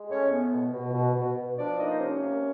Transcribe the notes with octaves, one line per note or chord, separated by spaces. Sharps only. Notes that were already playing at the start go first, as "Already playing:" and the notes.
Already playing: G#3
A2 C#4 C#5
B3
B2
B2
B2
B2
B2
F3 D4 D5
A#3 D#4 D#5
C5
C3 C#4 C#5
A#3